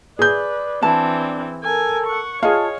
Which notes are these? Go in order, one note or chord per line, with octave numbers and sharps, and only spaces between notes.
G#4 B4 D5 G6
E3 C4 D4 A5
A4 A#4 G#5
F#5 C#6
F4 G#4 C#5 D#5 F5 A5